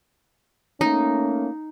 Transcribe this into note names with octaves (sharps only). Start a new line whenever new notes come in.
A3 A#3 C#4 D#4